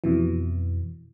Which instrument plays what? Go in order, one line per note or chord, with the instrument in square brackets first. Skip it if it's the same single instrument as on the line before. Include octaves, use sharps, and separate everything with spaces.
[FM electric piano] F2 B2 E3